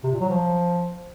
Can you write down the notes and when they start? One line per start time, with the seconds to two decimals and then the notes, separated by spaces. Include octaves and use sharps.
0.03 C3
0.12 A#2
0.20 F#3
0.29 F3